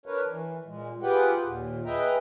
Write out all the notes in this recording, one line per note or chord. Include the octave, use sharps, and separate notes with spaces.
D4 A#4 B4 C#5
E3
A#2 G#3
F4 G4 G#4 B4 F#5 G5
D#2 A#2
G#4 B4 D#5 E5 G5 A#5